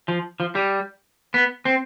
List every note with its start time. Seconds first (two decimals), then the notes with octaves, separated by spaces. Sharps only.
0.08 F3
0.40 F3
0.55 G3
1.34 B3
1.65 C4